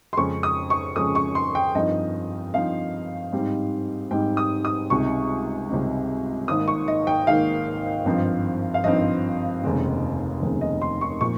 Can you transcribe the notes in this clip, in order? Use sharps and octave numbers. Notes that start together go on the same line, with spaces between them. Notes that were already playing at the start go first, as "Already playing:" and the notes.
C6
F2 C#3 G#3 C#4 C#6
D#6
C#6
F2 C#3 G#3 C#4 D#6
C#6
C6
G5
G2 F3 C4 D#4 D#5
G2 F3 C4 D#4 F5
G#2 G3 C4 D#4
G#2 G3 C4 D#4 G5
D#6
D#6
C#2 C3 G3 C4 D#4 C#6
C#2 C3 G3 C4 D#4
G#1 G#2 D#3 A#3 D#6
C#6
D#5
G5
G#1 G#2 D#3 A#3 F5
G#1 G2 F3 C4 D#4
F5
G#1 G2 F3 C4 D#4 D#5
F1 D#2 C#3 G#3 C4
F1 D#2 C#3 G#3 C4
D#5
C6
C#6
A#2 F3 C#6